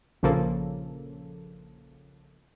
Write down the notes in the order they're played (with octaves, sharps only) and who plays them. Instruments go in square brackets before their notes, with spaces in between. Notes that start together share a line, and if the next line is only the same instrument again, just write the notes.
[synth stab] A#1 C#3 F3 A#3 A4